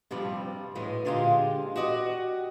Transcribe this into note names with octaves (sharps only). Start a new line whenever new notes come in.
G2 C3 F3 G3
A2 E3 G#3
A#2 D3 G#3 F4 G4 G#4
F#4 G4 D5 D#5